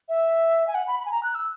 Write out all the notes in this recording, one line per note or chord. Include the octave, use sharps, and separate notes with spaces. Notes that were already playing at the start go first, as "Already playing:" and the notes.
E5
G#5
F#5
B5
B5
G#5
A#5
F#6
E6